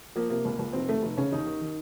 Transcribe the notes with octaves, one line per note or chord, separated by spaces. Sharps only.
F3 A#3
C3 A#3
C#2
C#2
F1 C4
D#2 A3
F1
C#3 C#4
D#2 D#4
D#3
D#3